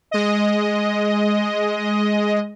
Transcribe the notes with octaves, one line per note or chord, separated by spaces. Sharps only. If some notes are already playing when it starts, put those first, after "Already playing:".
G#3 D#5